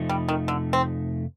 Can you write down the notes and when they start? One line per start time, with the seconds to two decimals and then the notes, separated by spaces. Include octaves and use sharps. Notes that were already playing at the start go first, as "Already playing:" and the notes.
Already playing: F2 C3 F3 A3 D#4
0.09 G3
0.29 D#3
0.48 D3
0.73 C4